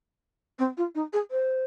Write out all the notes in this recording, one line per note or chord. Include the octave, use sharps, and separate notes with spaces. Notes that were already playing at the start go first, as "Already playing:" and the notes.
C4
F4
D#4
G#4
C5